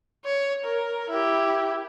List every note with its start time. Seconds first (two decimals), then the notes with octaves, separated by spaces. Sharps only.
0.25 C#5
0.64 A#4
1.10 E4 G4